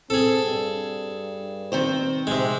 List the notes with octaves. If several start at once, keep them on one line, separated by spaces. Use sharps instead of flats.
C4 G#4 A4
G2
D#3 C4 C5
C3 G#3